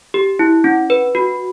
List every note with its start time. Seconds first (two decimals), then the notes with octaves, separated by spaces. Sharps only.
0.14 G4
0.39 E4
0.64 C#4
0.90 B4
1.15 F#4